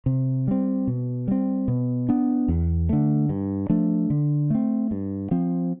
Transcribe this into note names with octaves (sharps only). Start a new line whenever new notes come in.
C3
G3 C4
B2
G3 C4
B2
B3 D4
E2
D3 A3
G2
F3 A3 D4
D3
A3 C4
G2
F3 C4